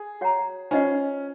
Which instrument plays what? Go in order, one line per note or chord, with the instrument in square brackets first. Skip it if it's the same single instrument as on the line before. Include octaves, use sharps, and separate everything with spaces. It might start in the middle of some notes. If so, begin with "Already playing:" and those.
Already playing: [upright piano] G#4
[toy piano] F#4 C#5 F#5 A#5
[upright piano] C#4 [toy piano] F4 C5 D#5 F#5